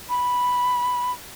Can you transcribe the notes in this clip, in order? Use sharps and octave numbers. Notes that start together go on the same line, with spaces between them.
B5